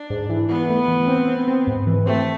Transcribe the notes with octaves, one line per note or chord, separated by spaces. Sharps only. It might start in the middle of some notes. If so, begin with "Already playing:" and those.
Already playing: D4
G#2
E3
E3 B3
A3
E3
C4
C4
C4
G#2
E3
A3 C4